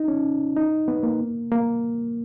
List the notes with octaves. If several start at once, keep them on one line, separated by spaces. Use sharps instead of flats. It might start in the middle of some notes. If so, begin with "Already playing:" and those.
Already playing: D#4
C#4
D#4
B3
A#3
A#3